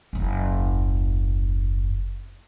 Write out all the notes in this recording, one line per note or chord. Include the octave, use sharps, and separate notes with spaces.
F#1 D#2